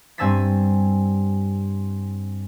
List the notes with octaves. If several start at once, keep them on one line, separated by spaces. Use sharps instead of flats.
G2 C4 G#5 E6 A6 B6